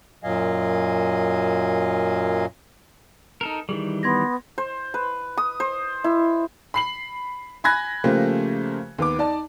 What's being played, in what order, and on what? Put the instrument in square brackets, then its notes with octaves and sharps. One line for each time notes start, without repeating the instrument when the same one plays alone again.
[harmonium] F#2 A#2 F#3 D#5 F5 G#5
[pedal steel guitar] D#4 A4 A#4
[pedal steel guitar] D#3 E3 G3 [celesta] G#4
[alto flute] B3 [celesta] C6 G#6 A#6
[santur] C5
B4
D#6
C5
E4
[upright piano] B5 C7 F#7
G#5 B5 F#6 G#6 A#6
C#3 F3 A3 A#3 G4 C5
D#2 B3 D6
D#4 D5 A5